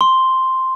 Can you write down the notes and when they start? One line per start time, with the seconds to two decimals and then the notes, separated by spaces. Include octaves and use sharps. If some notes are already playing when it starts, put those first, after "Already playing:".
0.01 C6